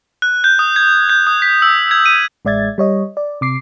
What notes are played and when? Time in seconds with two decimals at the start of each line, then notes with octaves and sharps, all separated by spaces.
0.22 F#6
0.44 G6
0.59 D#6
0.76 G#6
1.09 G6
1.27 D#6
1.42 B6
1.62 E6
1.91 G#6
2.06 D#7
2.45 A1 G#3 D5 E5 G#6 A6
2.78 G3 C#5 D#5
3.17 D5
3.41 C3 D6 C7